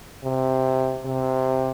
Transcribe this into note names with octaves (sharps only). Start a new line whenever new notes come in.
C3
C3